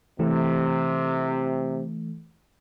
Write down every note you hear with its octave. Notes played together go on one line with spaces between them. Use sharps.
C3 E3 A3